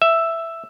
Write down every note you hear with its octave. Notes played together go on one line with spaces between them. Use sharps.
E5